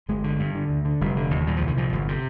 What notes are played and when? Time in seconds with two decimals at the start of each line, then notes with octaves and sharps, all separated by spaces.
0.09 G1 G#3
0.24 D3
0.40 G2
0.55 D3
0.69 D2
0.85 D3
1.01 F1 G3
1.17 D3
1.31 D#2
1.47 A#2 G3
1.57 C2 F3
1.67 D#3
1.77 A#2 F3
1.93 G1
2.08 C3